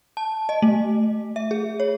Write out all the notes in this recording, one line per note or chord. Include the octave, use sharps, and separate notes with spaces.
A5
D#5
A3
E5
G#4
C#5